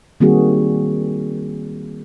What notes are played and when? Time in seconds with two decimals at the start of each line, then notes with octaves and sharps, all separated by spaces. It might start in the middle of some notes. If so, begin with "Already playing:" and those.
0.20 D#3 G3 A#3 C4 F#4 G#4